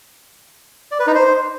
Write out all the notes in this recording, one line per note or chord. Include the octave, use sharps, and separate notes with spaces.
D5
B4
D#4
C5